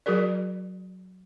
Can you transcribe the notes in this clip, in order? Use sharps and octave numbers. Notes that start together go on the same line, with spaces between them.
F#3 F#4 G#4 A#4 D5